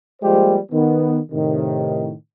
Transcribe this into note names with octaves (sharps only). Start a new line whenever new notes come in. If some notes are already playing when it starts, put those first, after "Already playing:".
F3 G3 G#3 A#3 G4 C5
D#3 B3
A2 C3 D#3